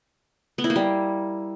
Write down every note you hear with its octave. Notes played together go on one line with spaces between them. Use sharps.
B3
E4
A#3
G3